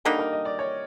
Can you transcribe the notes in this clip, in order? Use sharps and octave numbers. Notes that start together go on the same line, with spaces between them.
D3 G3 A#3 D#4 A#4
A#4
D#5
D5
C#5